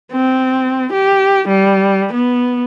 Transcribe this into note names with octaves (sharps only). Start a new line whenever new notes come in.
C4
G4
G3
B3